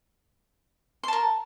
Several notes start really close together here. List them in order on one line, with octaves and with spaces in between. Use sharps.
C6 A5 A#4